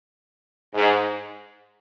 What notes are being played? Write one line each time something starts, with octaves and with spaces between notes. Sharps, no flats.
G#2